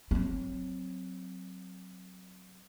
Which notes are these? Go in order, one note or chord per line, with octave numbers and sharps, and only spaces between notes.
F#3 C4